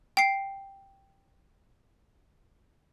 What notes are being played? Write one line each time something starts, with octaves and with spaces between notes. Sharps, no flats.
G5 C7